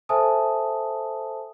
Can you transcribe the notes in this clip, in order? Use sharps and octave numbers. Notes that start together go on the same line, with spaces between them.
A4 C5 E5 G#5 A5 D#6